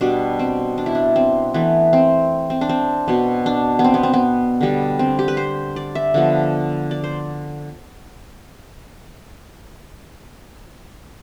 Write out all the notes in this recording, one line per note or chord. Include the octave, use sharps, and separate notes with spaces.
B2 G3 B3 D4
C4
D4
E4
D4
C4
E3 A3 B3
C4
C4
D4
C4
B2 B3
D4
B3
C4
B3
C4
B3
D3 G3 B3
C4
G4
B4
C5
D5
E5
D3 F3 B3
D5
C5